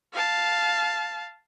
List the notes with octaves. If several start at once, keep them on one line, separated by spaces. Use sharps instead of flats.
F5 A5